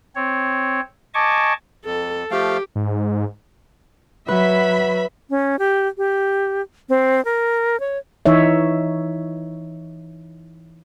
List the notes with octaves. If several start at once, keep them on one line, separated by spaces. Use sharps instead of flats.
C4 C#5
D#5 G#5 A5 C#6 D6
F2 A4
F3 A3 G4 F5
G#2
F#3 B4 E5 B5
C#4
G4
G4
C4
A#4
C#5
E3 D#4 C#5 E5